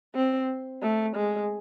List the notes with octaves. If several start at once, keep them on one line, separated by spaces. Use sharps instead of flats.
C4
A3
G#3